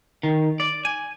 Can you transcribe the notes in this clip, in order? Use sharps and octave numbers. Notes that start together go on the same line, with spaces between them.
D#3
D5
G#5